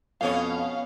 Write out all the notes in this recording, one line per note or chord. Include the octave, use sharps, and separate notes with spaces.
F2 B2 B3 C#4 C#5 F5